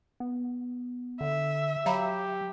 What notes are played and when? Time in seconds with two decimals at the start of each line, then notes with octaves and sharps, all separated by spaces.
0.20 B3
1.21 D3 E5
1.86 F#3 G4 F5 A#5 B5